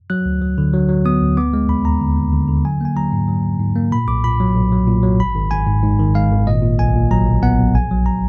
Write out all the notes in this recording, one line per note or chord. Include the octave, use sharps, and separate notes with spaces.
F#3 F#6
D2
F#3
D3
F#3
F#3
B3 D#6
D2
B3 D6
G#3
D#2 B5
D#2 A#5
D3
D#2
D3
D3
F#3 G#5
A#3 G#5
F#3 A#5
G#2
F#3
G#2
G#2
A#3
A#2 B5
B1 D6
A#2 B5
F#3
B1
F#3
A#2
F#3
G#1 B5
G#1
G#1 G#5
G#2
G#2
D#3
G#3 F5
G#1
A#2 D#5
A#2
B1 G#5
A#2
F#3 A#5
B1
B3 F#5
B1
A#1 G#5
F#3
A#5